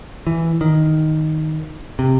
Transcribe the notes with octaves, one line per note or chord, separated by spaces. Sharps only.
E3
D#3
C3